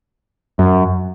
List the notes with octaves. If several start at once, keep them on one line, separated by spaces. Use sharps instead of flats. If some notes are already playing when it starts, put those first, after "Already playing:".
F#2